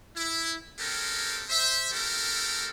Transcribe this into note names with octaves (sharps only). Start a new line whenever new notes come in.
E4
G#3 C4 C#4 G4 A4 A#4
C5 E5
A3 C4 E4 G4 A4 A#4